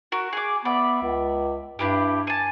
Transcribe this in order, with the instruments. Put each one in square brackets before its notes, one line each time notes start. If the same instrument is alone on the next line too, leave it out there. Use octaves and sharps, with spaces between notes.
[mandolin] F#4 A#4
G#4 D6
[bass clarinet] B3 [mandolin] D5 E5
[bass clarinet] C#2
[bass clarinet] G2 [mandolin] D4 E4 G4
[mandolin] G#5 A5